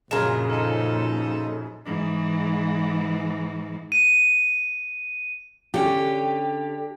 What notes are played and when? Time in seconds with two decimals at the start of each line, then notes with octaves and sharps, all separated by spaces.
0.11 A#1 F#2 C#3 G#3 F4 A#4 E7
0.50 D#4 A4
1.86 G#2 E3
3.92 D#7
5.74 D3 C#4 G4